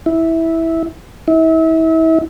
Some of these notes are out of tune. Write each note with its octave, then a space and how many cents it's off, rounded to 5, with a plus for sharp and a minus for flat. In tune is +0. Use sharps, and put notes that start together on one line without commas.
E4 -10
E4 -35